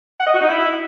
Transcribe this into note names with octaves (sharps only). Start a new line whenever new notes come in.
F#5
D#5
F#4
D#4
E4